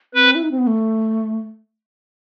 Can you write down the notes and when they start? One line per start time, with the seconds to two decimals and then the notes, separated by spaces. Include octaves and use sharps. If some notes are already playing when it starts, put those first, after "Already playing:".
0.14 C4 B4
0.35 E4
0.43 D#4
0.51 C4
0.58 B3
0.67 A3